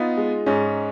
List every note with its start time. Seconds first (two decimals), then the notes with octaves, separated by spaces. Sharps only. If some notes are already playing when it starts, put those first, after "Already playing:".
Already playing: B3 D#4 F4
0.17 G#3
0.46 G#2 C#4 D#4